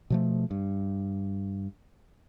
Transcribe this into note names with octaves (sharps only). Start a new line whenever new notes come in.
B2 F3 A3
G2